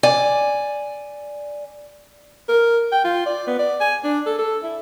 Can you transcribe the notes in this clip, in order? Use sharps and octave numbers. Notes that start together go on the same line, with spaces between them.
D5 G#5
A#4
G5
F4
D5
B3
D5
G#5
D4
A4
A4
E4